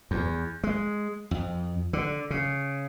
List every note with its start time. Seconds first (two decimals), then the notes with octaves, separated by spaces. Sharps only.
0.11 E2
0.64 G#3
1.31 F2
1.93 D3
2.30 C#3